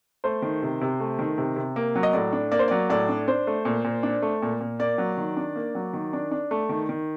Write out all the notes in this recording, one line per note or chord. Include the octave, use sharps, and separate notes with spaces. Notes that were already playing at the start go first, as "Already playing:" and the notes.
A3 C5
D#3
C3
C3
A3
D#3
C3
C3
A#3
F#3
D#5
A2 D5
D4
A#3 D5
C5
F#3 D5
A2 D5
D4
D4 C5
A3
A#2
A#2
D4
A3
A#2
A#2
A#3 D5
F#3
D#3
D4
A#3
F#3
D#3
D4
D4
A3
D#3
D#3